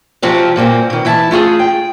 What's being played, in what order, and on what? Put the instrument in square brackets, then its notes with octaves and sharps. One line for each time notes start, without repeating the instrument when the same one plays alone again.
[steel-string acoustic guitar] C3 F3 F#3 C4 F4 G4
G2 A#2 A#3 C4
B2 D#3
E3 E4 E5 A5
A3 F4 G4 G#4
G5